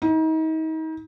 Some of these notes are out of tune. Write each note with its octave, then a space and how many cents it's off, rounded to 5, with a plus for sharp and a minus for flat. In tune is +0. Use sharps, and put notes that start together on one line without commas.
D#4 +35